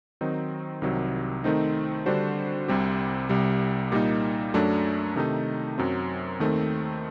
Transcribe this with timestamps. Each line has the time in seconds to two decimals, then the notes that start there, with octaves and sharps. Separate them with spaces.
0.21 D#3 F#3 C4 D#4
0.82 C2 C3 D#3 F#3
1.44 D#3 A3 C4 D#4
2.06 D3 G3 D4 F#4 C5
2.68 C2 C3 G3 C4 G4
3.29 C2 C3 G3
3.92 A#2 G3 A#3 D#4
4.54 F#2 F#3 A3 D4
5.16 C3 D#3 A3 D#4
5.78 F#2 F#3 C4
6.40 D#2 D#3 A3 C4